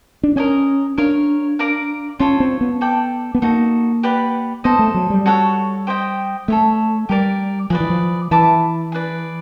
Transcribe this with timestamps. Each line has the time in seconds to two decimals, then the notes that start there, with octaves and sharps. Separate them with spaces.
0.23 D4
0.36 C#4 A#4 D#5 G#5
0.98 D4 A#4 C#5 F5
1.59 A#4 D5 F5 A#5
2.19 C#4 F4 A4 C#5
2.40 C4
2.61 B3
2.81 A4 D5 G5
3.35 B3
3.42 A#3 D#4 F#4 A4
4.03 G4 B4 D5 F#5
4.64 B3 A4 C5 D#5
4.79 A3
4.94 F#3
5.10 G3
5.26 F#4 A4 C#5 F#5
5.87 G4 C5 D#5 G5
6.48 A3 A4 C#5 E5
7.09 G3 G4 A#4 D5
7.70 F3 G#4 B4 D5
7.80 E3
7.90 F3
8.31 E3 B4 E5 A5 D6
8.92 G#4 B4 D5